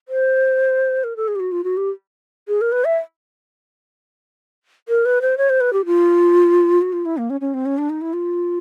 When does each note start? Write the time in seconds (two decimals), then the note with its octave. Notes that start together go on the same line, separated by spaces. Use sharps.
0.08 C5
1.04 A#4
1.16 A4
1.28 G#4
1.35 G4
1.40 F#4
1.52 F4
1.64 F#4
1.77 G4
2.48 G#4
2.61 A#4
2.72 B4
2.85 E5
4.88 A#4
5.05 B4
5.22 C5
5.37 C#5
5.50 C5
5.60 B4
5.73 G4
5.85 F4
6.81 F#4
6.93 F4
7.05 E4
7.17 A#3
7.30 C#4
7.41 C#4
7.54 C4
7.66 C#4
7.78 D4
7.89 D#4
8.01 E4
8.13 F4